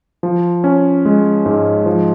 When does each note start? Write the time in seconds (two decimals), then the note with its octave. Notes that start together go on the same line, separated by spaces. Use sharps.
0.23 F3
0.64 C#4
1.06 G#3
1.46 G#2
1.86 F3